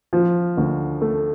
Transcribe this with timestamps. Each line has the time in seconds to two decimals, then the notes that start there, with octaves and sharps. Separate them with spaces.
0.13 F3
0.57 D2
1.02 A3